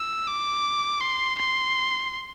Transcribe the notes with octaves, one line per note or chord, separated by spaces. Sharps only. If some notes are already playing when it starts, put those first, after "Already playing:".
Already playing: E6
D6
C6
C6